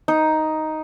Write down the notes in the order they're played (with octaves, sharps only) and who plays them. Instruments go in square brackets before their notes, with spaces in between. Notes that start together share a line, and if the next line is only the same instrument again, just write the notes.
[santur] D#4